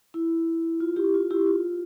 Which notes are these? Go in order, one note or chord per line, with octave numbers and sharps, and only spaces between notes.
E4
F4
E4 G4
F4
E4 G4
F4